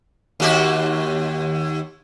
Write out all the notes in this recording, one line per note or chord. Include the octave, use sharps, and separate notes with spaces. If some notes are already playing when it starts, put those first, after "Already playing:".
D#2 F#4 G4